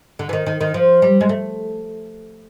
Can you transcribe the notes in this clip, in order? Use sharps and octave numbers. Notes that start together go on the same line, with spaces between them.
D3
E3
D#3
D#3
D#3
F3
G3
G#3
A3